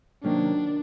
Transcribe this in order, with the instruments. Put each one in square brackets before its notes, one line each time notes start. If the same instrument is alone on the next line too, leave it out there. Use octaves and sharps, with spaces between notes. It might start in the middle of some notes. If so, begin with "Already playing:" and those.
[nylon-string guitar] C3 D#3 F#3 A#3 C#4 [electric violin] D4